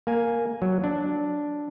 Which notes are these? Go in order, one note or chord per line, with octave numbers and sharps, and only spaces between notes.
A#3 G#5
F#3
D4